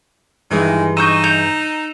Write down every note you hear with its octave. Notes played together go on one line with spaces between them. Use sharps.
G2 D#3 E3 G#3
D#4 D#5 A#5 C#6 E6 G6 E7
G6 C#7 F7